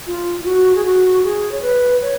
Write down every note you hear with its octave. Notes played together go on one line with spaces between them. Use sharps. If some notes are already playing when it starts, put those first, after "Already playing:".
F4
F4
F#4
G#4
F#4
G#4
C#5
B4
C#5